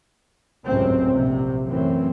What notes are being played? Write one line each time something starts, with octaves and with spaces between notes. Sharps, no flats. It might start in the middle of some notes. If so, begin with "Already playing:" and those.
G#1 C#2 F#2 A2 C3 C4
A#1 C3
F#2 A2 E3 C4